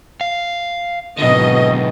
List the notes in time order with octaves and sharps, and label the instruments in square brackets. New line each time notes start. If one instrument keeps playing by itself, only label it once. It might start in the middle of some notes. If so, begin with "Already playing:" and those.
[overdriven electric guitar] F5
[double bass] G#1 B2 [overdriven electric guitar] D3 F#3 [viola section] D#5